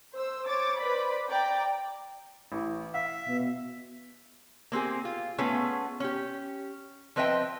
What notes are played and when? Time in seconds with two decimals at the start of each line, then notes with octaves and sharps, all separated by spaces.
0.14 C5 E6
0.46 C5 C#5 D6 A6
0.78 B4 C5 D5 B5
1.30 D5 G5 A#5
2.52 A1
2.94 E5 F5
3.27 B2
4.72 A#3 C4 G4 G#4
5.05 F4
5.38 A3 B3 C#4 F4 G#4
6.00 C#4 G4
7.16 F3 C4 B4 D#5 E5 G5